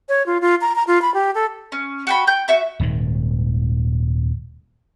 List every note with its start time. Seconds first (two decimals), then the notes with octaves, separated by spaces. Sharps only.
0.09 C#5
0.26 F4
0.41 F4
0.61 A#5
0.76 A#5
0.87 F4
1.02 B5
1.14 G4
1.35 A4
1.72 C#4
2.07 F#4 G5 B5
2.27 G5 G6
2.48 F#4 E5 C#6
2.80 D#1 G#2 D#3